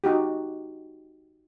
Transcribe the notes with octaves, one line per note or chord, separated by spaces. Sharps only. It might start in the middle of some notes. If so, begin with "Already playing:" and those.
D#4 F#4 G4